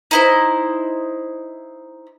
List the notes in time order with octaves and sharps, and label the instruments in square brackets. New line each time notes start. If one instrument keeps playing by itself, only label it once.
[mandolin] D#4 E4 C5